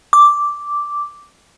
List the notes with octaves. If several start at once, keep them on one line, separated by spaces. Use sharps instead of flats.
D6